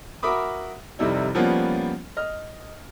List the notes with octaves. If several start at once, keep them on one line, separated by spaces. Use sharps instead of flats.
F#4 A#4 E5 B5 D6 D#6
F1 C3 G3 D#4 E4
F3 G3 A#3 B3 C#4 F4
D#5 F6